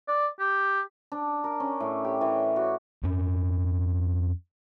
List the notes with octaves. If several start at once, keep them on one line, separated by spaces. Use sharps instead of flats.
D5
G4
D4
A#4
C#4
A2
G4
E3
F#4
F2 C#4